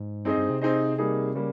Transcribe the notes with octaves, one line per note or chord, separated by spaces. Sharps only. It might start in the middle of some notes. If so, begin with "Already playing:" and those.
Already playing: G#2
G2 C4 D#4 G#4 C5 D#5
G2
C3
C4 D#4 G#4 C5 D#5
G3 A#3 D#4 G#4
C#3 G3 A#3